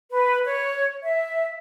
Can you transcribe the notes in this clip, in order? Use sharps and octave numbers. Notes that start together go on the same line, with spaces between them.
B4
C#5
E5